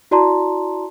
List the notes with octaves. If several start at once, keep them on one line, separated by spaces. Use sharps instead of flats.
E4 F#4 D5 A5 A#5 C6